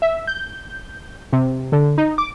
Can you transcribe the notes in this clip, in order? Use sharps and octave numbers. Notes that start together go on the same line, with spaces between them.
E5
G6
C3
D3
D#4
D6